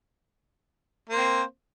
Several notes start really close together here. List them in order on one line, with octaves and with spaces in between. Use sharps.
A#3 C5 C4